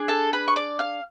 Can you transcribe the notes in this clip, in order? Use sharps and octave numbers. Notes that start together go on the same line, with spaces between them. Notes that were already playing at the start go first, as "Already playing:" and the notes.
Already playing: D4 G#4
A4 A5
B4 B5
C#6
D5 D6
F5 F6